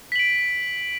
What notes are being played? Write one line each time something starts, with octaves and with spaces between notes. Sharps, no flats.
B6 D7 F#7